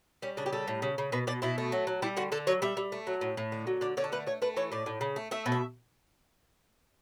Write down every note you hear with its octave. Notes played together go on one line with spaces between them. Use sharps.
G3 C#4
C#3 D4
G4
G3 A4
A2
C#3
C#3
B2 B4
B2 D5
B2 E4
A3
F#3
F#3
G3 E4
D3 F#4
D3 A4
F#3 C#5
G3 E5
G3
A3
F#3
A2
A2
D3
F#3
D3 D5
D3 C#5
A4
A3 B4
A3 C#5
A3 B4
E3 C#5
A2 D5
A2
C#3
A3
A3 E5
B2
E5